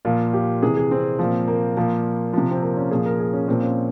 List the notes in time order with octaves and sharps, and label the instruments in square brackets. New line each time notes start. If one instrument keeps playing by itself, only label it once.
[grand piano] A#2 F3 F4
G4
C3 E3 G#4
G#4
C4
A#2 F3
A#3
A#2 F3 A#3
C3 F3
C4
A#3
C#4
A#2 F3 G#4
A#4
G#4
C#4
A#2 F3 C4
C#4